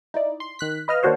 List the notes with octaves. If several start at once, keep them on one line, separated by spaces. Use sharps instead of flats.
D#4 E4 D5
C6
D#3 F#6 B6
B4 D#5 F5 F6
D#3 A#3 D4 F#4 C5 C#5